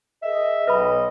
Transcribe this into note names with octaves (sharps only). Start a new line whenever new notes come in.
G#4 A#4 D#5 E5
B1 B4 D#5 B5